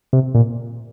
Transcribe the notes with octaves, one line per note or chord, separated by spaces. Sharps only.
C3
A#2